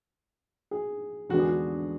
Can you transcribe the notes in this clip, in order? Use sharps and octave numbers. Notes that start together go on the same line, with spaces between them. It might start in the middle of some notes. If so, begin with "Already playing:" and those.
G#4
E2 D3 G#3 B3 D4 F#4
G#4
F#4